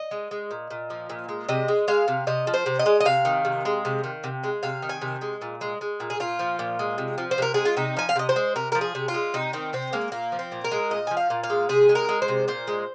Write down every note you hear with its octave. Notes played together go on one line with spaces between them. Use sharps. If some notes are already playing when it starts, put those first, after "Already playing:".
Already playing: D#5
G#3
G#3
A#2
A#2
F3
A#2
G#3
C3 D#5
G#3
G#3 F5
C3
C3 D#5
F3
C5
C3
D#5
G#3
D#5
C3 F5
D#3
C3
G#3
C3
D#3
C3
G#3
C3 F5
D#3
G#5
C3
G#3
A#2
G#3
G#3
A#2
G#4
A#2 F4
F3
A#2
G#3
C3
F3
C5
C3 A#4
G#3 G#4
F4
C3 D#4
F3 G#5
F5
C3 D#5
C5
G#3
C3 A#4
F3 A#4
G#4
C3
F4
G#3
C3 D#4
D#3 C4
C3 C4
G#3 A#3
A#2 A#3
F3
C4
A#2
A#4
G#3
A#2 D#5
F3 G#5
F5
A#2
F5
G#3
C3 G#4
G#3
A#4
G#3
C5
C3
A#2 C5
G#3